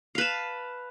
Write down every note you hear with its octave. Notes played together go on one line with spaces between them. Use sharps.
B4 F5 A5